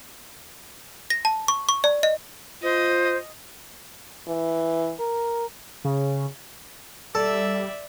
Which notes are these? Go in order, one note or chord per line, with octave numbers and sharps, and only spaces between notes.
A#6
A5
C#6
C#6
D5
D#5
F4 C5 D#5
E3
A#4
C#3
G3 A4 D5 E5